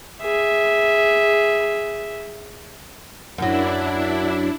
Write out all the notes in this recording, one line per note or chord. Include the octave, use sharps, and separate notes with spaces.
G#4 E5
F#2 F#3 D4 E4